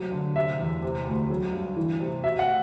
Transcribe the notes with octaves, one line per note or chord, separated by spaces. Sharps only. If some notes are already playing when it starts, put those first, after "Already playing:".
Already playing: C3 F#3
D3
C3 E5
E2
C3
D2
F#3
G2
E3
C3
B2 E5
F#5